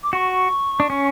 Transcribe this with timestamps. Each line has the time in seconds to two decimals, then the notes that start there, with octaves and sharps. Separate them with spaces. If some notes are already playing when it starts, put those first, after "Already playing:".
0.03 D6
0.13 F#4 C#6
0.80 D4
0.90 C#4